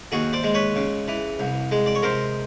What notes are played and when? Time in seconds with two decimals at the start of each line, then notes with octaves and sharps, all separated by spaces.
0.12 D#2 F#4 G#4
0.33 C5 D5
0.44 G#3
0.54 B4 C#5
0.76 C#3
1.08 E3
1.39 C2
1.71 G#3
1.86 D5
1.95 C#5
2.03 C3 A#4 C5